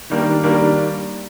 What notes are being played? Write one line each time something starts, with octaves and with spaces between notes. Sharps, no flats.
D#3 G3 A#3 D4
D#3 G3 A#3 D4